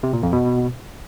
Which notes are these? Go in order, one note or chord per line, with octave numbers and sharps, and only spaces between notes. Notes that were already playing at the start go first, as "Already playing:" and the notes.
C3
A#2
F2
B2